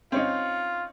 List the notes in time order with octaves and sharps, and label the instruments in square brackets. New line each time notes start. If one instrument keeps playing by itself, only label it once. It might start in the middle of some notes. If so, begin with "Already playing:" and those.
[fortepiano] C4 C#4 D#4 [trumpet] F4